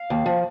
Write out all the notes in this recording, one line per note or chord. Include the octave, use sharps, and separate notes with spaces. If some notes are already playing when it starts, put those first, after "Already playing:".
Already playing: F5
D#2
F3